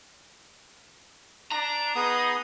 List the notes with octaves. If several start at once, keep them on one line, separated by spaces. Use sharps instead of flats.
D4 A#5
B3 D#4 G#4 D#6